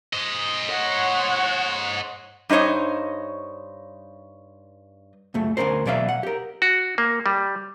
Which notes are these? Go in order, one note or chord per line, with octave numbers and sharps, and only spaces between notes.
C5 D#5
C#5 F#5
G2 D#4 C5 C#5 D#5
C#2 F#2 A3
D2 G#2 C#4 A#4 C5
B2 F#3 D5 E5 F5
F#5
G4 A#4
F#4
A#3
G3